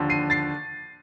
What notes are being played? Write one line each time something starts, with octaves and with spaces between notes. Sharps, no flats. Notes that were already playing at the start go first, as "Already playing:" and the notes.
Already playing: D#2 D3 F3
C7 D#7
A6 C7